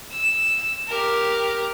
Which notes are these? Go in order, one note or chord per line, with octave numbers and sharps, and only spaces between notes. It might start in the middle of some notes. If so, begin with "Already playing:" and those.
E6
G4 A#4